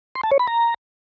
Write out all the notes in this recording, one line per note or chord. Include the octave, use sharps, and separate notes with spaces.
C6
A5
C#5
B5
A#5